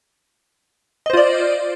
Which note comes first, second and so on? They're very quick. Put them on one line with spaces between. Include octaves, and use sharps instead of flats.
D#5 C5 F4 D5